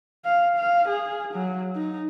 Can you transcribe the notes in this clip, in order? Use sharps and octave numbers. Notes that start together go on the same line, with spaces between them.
F5
F5
G#4
F#3
D#4